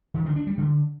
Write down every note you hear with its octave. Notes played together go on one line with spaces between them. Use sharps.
D#3
D3
D4
G3
D3